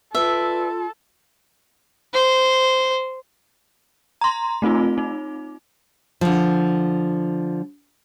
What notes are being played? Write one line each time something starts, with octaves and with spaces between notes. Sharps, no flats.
F4 A4 B4 D5 E5
C5
A#5 C6
A3 C4 D#4 F4
D#4
D3 F3